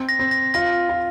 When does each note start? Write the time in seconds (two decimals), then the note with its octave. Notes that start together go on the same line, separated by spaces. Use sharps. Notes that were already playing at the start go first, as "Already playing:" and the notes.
Already playing: C4
0.09 A#6
0.19 C4
0.31 A#6
0.54 F4 A#6
0.89 F4